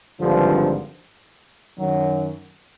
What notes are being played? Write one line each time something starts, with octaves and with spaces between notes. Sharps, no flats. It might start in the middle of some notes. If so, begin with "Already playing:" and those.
G#1 G2 D3 F3
F#2 D#3 F#3